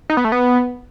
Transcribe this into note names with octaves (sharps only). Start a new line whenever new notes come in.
D#4
B3
A3
B3